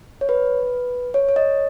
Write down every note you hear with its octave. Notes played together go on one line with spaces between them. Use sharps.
C#5
B4
C#5
C#5
D#5